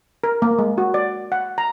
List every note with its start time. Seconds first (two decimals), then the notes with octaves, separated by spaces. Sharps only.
0.24 A#4
0.42 A#3
0.59 G#3
0.78 F#4
0.94 D5
1.32 F#5
1.58 A#5